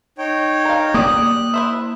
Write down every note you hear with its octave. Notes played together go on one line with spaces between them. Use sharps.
D#4 C#5 G5
F5 A#5
A#3 G4 D5 D#6 F#6
E4 C5 E5